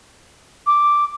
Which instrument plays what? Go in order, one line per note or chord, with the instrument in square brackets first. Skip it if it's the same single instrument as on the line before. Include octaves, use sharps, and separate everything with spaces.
[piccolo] D6